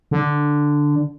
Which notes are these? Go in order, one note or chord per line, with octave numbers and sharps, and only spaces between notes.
D3